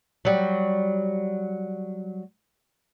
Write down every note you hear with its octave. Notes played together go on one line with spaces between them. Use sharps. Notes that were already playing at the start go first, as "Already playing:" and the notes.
F#3 G3